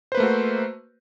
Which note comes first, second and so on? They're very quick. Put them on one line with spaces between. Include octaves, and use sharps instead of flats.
C5 B4 A#3 A3 F#4